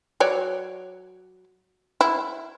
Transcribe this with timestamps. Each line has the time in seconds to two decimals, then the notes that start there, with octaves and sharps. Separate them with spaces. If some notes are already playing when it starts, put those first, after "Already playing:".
0.20 F#3 C#5 D5
2.01 E4